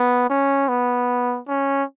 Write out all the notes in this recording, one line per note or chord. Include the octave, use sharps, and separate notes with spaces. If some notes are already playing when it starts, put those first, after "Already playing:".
Already playing: B3
C#4
B3
C#4